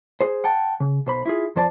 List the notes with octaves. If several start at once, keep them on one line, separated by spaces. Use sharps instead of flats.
G#4 C5
F#5 G5 A5
C#3
B1 C5 B5
E4 F4 G#4
F2 F3 C5 D5 A5